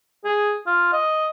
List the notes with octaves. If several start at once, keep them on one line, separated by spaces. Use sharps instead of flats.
G#4
F4
D#5